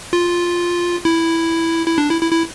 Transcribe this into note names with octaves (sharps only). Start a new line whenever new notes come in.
F4
E4
E4
D4
E4
E4
E4